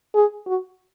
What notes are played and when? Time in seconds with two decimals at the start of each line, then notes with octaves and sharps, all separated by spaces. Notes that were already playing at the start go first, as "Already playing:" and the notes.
0.15 G#4
0.47 F#4